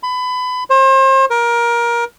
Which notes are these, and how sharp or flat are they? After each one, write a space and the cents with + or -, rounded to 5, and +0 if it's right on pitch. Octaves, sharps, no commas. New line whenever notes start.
B5 +25
C5 +35
A#4 +20